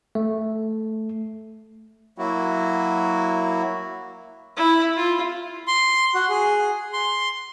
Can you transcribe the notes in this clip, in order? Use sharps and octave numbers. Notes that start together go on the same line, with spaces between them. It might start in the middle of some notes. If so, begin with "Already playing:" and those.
A3
F#3 A#3 E4 F#4
E4
F4
C6
F#4
G#4
C6